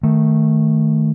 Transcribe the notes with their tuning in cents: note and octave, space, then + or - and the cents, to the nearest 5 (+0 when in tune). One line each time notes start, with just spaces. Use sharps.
D#3 +0 A3 +0